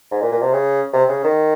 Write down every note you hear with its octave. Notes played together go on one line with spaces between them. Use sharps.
G#2
A#2
A#2
C3
C#3
C3
C#3
D#3